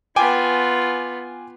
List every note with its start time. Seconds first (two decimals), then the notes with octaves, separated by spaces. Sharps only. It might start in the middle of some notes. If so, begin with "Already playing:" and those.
0.16 B3 F4 G5 G#5 D6